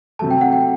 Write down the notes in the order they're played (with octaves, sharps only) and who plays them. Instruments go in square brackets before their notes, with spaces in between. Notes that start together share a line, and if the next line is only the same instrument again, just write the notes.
[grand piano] C3 F#3 A3 [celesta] A5
[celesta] G5
F#5
G5